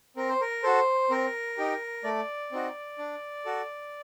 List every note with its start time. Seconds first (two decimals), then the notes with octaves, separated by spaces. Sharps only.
0.17 C4 A#4
0.29 C5
0.41 A#4
0.63 F#4 A4 C5
1.10 C4 A#4
1.58 D#4 G4
2.04 A3 D5
2.52 C4 D#4 F#4
2.98 D4
3.45 F#4 A4